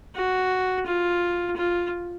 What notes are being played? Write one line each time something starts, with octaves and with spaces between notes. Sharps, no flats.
F#4
F4
F4